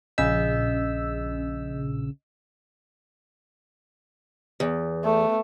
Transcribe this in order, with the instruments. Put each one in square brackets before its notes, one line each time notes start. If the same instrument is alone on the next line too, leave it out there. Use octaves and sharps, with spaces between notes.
[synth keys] A#1 C#3 E6 [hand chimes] D#5 G6 B6
[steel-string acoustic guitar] E2
[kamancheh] A3